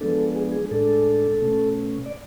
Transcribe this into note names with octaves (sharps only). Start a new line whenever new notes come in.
F3 G#3 B3 D4 A4
G#4
G#4
A2 G#3 D4 A4
B2 A3 C#4
D5